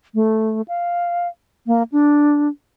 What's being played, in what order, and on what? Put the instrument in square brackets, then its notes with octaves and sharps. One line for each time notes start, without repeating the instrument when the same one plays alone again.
[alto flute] A3
F5
A#3
D4